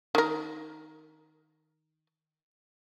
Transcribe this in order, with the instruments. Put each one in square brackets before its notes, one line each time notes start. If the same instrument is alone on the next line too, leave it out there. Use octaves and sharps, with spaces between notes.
[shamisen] D#3 A#4